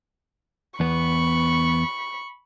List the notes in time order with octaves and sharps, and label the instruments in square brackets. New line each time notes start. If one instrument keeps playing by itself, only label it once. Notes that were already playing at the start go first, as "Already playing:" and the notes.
[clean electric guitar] E2 B3 [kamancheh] B5 C#6